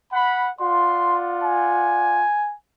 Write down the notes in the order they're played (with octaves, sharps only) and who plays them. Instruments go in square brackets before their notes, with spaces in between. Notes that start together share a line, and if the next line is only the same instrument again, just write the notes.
[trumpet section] F#5 B5
[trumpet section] F4 D5 F#5 [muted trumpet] C6
[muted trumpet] G#5